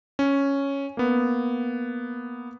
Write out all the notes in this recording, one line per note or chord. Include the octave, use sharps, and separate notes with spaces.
C#4
A#3 B3